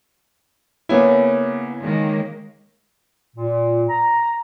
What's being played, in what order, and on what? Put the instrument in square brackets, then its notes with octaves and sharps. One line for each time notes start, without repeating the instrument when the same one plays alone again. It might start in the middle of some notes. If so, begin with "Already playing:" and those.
[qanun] C#3 G#5 [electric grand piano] A#3 B3 E4
[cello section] D#3 G#3 A#3
[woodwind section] A#2
A#5